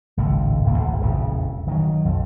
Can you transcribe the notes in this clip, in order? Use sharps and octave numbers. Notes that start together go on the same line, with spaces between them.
G#1 C#2 A2
D#1 G#1 C#2 A#3
G#1
E1 A#1 F2 C#3
D#3 F3 F#3
B1 F2